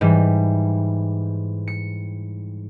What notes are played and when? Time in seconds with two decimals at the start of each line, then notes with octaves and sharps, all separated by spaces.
0.01 G#2 E3 G3
1.68 C#7